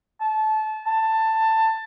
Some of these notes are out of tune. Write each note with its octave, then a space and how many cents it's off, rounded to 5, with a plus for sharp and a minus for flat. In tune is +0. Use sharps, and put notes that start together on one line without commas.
A5 -25
A5 +15